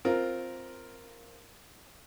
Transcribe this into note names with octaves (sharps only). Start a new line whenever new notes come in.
C4 F4 A#4